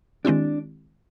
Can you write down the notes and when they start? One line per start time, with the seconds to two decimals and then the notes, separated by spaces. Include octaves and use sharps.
0.25 D#3 G#3 C4 D4 E4 G4